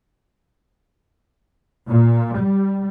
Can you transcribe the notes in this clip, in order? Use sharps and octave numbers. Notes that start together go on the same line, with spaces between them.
A#2
G3